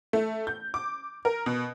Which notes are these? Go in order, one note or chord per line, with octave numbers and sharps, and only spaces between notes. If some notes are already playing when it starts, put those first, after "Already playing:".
A3
G6
D6
A#4
B2